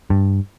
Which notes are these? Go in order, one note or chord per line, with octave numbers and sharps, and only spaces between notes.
G2